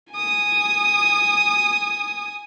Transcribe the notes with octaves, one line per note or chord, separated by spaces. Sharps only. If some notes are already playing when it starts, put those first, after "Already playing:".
G#5 D#6